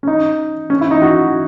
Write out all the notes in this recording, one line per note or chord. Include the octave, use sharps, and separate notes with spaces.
C#4
D#4
C#4
E4
D#4
F#4